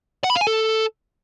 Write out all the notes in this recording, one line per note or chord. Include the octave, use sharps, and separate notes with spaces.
F#5
B5
F5
G#5
A4